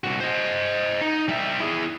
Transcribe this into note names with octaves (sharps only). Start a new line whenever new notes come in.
C2 F#4
C5 D#5
D#4
G3 E5
E4 G#4